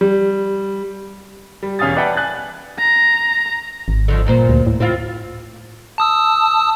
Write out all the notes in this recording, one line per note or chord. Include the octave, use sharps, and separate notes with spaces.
G3
G3
E1 C#4 F5 G#5 D#6 A6
B4 D5 E5 F#5 G5 A5
G#5 F#6 A6
A#5
G#1
D3 D#3 F3
G2 A#2 C5
D2
A2
A2 C4 E4 F4
A5 D#6 E6